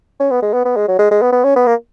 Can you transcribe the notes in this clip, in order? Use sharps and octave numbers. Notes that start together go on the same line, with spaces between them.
C#4
B3
G#3
B3
B3
G#3
F#3
G#3
G#3
B3
B3
C#4
B3
A#3